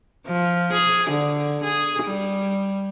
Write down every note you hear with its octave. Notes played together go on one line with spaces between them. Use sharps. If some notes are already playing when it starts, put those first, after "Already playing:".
F3
G#4
D3
G#4
G3